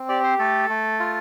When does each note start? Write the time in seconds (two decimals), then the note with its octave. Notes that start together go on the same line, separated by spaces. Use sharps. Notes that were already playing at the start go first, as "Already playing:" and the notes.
Already playing: C4
0.09 G4 D5
0.23 C5
0.39 A3 A4
0.69 A3
1.00 F4